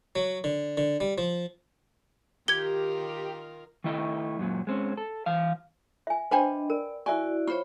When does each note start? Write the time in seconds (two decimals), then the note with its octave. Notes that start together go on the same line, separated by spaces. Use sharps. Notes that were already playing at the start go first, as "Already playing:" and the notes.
0.15 F#3
0.44 D3
0.77 D3
1.00 G3
1.18 F3
2.48 D#3 F4 G4 A#4 G#6 G7
3.84 D#3 A3 E4 D#5
4.39 F#2 A#2 F#3
4.67 G#3 C4 C#4
4.97 A4
5.26 E3 F5
6.07 E5 G#5
6.31 D4 B4 C5 D#5 G5 G#5 B5
6.70 A#4 D5
7.06 E4 F#4 D5 E5 G#5 C#6
7.48 F4 C5 C#5 B5 C#6